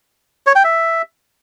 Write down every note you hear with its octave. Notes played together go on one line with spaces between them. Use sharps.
C#5
G5
E5